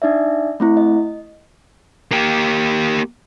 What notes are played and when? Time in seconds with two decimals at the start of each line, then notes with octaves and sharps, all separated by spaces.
0.02 D4 D#4 D5 E5
0.60 A3 C4 E4
0.77 D#5
2.11 A#3 G4